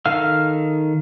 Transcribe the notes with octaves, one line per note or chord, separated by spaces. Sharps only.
D#3 A4 F5 F6